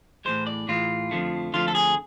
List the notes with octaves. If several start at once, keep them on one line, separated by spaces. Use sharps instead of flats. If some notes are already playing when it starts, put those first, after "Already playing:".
A2 E3 G#3 C5
D5
A2 E3 G#3 F4
F2 D3 F3 A3
F2 D3 F3 A3 F4
A4
G#4